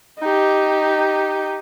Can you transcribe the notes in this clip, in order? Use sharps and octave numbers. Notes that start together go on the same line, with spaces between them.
D#4 G4